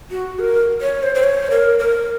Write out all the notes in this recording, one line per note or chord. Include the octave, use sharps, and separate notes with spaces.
F#4
A#4
C#5
C5
C5
C#5
A#4
A#4